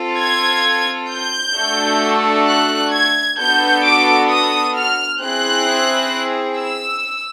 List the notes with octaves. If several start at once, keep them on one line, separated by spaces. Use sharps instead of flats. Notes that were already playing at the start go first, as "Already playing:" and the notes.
Already playing: C4 F4 A4
G#6
G6
A3 D4 F#4 A4
F#6
G#6
B3 D4 F#4 A4 G6
D6
D#6
F6
C4 E4 G#4 F#6
E6